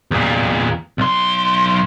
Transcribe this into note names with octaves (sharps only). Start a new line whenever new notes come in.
E2 A#2
B1 C6